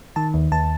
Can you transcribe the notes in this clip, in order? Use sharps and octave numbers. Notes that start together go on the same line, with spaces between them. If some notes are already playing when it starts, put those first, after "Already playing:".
D#3 A5
D#2
D#2 A5